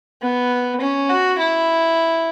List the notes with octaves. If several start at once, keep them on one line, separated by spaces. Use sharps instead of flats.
B3
C#4
F#4
E4